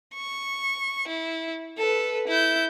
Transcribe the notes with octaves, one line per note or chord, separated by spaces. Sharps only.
C#6
E4
A4 B4
E4 G6